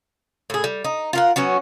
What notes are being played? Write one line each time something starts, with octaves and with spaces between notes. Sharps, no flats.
A2 G#4
G3
D#4
F4 A#4 F#5
F#3 B3 C#4 F#4